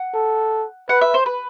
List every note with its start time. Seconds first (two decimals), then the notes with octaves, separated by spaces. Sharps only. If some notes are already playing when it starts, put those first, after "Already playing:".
Already playing: F#5
0.14 A4
0.89 B4 F#5
1.01 E5
1.14 C5
1.26 B4